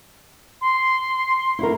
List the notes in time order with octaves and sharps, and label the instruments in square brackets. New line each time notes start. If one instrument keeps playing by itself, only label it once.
[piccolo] C6
[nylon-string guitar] E4 F#4 A#4